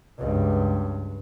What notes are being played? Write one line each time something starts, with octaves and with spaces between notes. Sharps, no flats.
C#2 G2